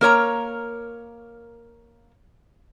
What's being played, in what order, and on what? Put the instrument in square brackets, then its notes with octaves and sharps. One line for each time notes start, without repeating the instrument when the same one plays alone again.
[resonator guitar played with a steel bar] A#3 A#4 C#5 A#5